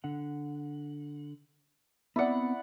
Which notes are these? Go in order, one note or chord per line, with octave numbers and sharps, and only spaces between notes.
D3 F#5
B3 C4 E4 D5 F#5